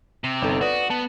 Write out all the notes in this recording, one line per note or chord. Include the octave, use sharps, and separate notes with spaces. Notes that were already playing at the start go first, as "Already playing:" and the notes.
C3
G1 D#4 A4
F#4 B4 D5 D#6
B3 A5